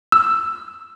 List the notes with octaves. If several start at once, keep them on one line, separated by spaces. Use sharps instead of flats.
E6